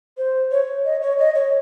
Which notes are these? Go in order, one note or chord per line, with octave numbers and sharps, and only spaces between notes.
C5
C#5
D#5
C#5
D#5
C#5